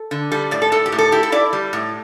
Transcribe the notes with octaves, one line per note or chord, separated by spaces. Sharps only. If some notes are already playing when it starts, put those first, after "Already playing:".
Already playing: A4
D3
G3 A4
A2 D5
A4
A2 A4
G4
A2
A4
E4 G4
A4
E4 D5
G3
A2